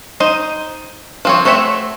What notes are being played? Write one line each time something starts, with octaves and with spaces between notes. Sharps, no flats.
D#4 C5 D#5
F3 C4 C#5
A3 C4 F#4 C#5 E5